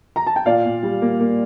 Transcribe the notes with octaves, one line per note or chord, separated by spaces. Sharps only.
A#5
A5
G5
A#2 D5 F5
A#2
G3
A#3
A#3